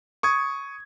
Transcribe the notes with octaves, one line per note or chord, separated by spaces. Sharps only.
C#6 D#6 G#6